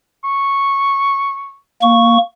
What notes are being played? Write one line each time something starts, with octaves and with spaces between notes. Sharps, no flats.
C#6
A#3 C#6